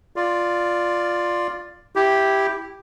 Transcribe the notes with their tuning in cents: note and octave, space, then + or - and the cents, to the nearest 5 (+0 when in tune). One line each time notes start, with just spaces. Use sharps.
F4 +0 D5 +5
E4 +0 G4 +0